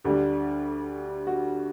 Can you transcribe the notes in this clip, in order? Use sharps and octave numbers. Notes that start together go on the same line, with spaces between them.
D2 D3 G3 G4
F#4